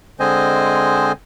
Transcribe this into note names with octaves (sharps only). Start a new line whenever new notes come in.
D3 G#3 C4 C5 D#5 G#5